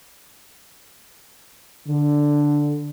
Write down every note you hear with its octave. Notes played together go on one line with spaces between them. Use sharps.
D3